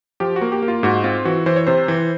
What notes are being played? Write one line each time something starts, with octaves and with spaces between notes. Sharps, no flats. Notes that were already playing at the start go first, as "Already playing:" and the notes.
F3 G4
F#4
A#3
G4
A#3
F4
G#2 F#4
C4 F4
E3 F#4
E3 C5
C#5
C3 C5
E3